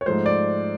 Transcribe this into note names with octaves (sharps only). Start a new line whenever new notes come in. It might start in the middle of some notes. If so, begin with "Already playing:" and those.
C#5
G#2 F3 A3 C5
D5